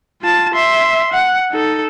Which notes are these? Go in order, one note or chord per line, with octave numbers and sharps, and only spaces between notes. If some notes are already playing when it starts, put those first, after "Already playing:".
F4 A5
E5 C6
F#5
D#4 A4